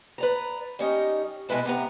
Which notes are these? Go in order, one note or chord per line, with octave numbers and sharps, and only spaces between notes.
B4 D5 A#5
G3 C#4 D#4
B2 G#3 E4 B4 A5
C3 B3 A#5